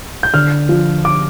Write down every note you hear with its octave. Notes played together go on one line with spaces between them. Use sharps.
G6
D3 F6
F3
D6